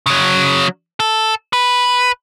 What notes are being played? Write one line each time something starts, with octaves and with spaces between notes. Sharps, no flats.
C#3 F#3
A4
B4